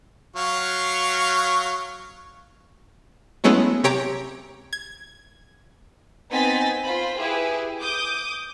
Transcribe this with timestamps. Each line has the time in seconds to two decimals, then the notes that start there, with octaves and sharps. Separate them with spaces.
0.36 F#3 F5 C#6
3.44 F#3 G#3 A3 B3 C#4 E4
3.84 C3 G4 C#5 G5 A#5
4.73 G#6
6.31 B3 C4 D#4 G#5 A6 B6
6.85 F4 C5 B5
7.18 E4 G4 G#4 B4
7.80 D6 D#6 G6